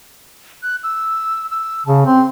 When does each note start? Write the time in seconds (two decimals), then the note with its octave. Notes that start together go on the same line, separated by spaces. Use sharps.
0.63 F#6
0.83 E6
1.51 E6
1.86 C#3 A5
2.06 C4 C6